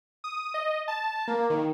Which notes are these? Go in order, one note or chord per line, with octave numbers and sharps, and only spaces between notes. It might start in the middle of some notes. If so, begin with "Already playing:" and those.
D#6
D#5
A5
A#3
D#3